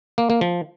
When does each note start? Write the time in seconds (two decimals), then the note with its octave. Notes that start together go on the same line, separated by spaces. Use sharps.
0.18 A#3
0.30 A#3
0.41 F3